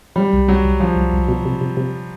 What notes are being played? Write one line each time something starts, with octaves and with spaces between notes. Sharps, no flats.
F#3 G3
C2
C2 F#3
C2
F3 F#3
C2
C2
B2
C3
C3
C3